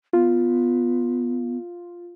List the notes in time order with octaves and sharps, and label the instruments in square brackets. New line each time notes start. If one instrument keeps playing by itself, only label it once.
[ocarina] B3 [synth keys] F4